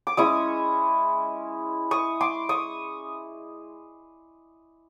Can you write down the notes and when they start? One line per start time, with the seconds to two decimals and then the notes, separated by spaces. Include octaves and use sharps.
0.07 D6
0.17 G#3 C#4 E4 C#6 D#6
1.91 C#6 D#6
2.21 C6 D6
2.49 C#6 D#6